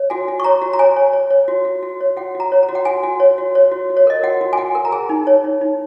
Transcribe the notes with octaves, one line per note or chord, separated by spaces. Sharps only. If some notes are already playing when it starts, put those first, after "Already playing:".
Already playing: C#5
F#4 G#5
F#4
C#6
C#5 A#5
F#4
A#5
C#5 G#5
C#5
C#5
C#5
F#4
F#4
F#4
C#5
F#4 F#5
F#4
A#5
C#5
A#5
F#4
F#5
F#4 G#5
F#4
C#5
F#4
C#5
F#4
F#4
C#5
A#4 D#5
F#4 F#5
F#4
G#5
F#4 F#5
A#4
A#5
G#4 G#5
D#4
C#5
D#4
D#4